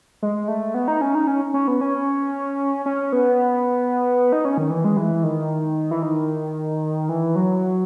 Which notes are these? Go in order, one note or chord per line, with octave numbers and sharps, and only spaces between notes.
G#3
A3
B3
D#4
C#4
D#4
C#4
C#4
B3
C#4
C#4
B3
D#4
C#4
D#3
E3
G#3
E3
D#3
E3
D#3
E3
F#3